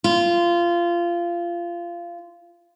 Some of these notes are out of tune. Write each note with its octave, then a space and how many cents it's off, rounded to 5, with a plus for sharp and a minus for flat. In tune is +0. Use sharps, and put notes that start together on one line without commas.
F4 -20